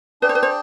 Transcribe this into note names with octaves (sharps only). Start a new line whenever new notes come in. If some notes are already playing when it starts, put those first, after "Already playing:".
D4 G#4 B4 D5 G5
C5
B4
C5